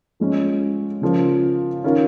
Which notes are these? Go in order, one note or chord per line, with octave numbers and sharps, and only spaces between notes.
F3 G#3 C#4
C#3 F3 C#4 F4 A#4
D#3 C#4 F4 A#4